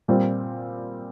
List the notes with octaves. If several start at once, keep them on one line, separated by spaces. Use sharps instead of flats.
A#2 G3 C4